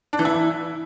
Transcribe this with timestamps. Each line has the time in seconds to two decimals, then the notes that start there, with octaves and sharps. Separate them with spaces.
0.13 D4
0.19 E3
0.25 E4